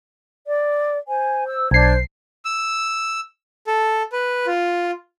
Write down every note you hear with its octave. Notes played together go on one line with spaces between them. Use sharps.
D5
C5 G#5
E6
B1 D4 C5 G#6 C7
E6
A4
B4
F4